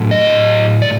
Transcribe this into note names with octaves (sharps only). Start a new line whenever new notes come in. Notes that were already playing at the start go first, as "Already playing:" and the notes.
Already playing: A2 F#3 A3
D#5
D5